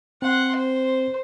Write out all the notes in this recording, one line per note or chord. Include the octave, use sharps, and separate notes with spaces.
C4 F#5 C6
C5